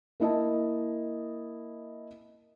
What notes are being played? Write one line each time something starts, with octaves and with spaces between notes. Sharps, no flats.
A#3 E4 D#5 A5